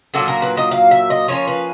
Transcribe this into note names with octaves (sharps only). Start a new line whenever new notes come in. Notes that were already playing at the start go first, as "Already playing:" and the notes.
A#2 F#3 A#3 D4 A4
A#4
B4
D#5
F5
E5
D#5
F3 A#3 C#4 C#5
B4